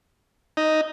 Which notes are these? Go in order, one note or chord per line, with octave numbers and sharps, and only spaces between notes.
D#4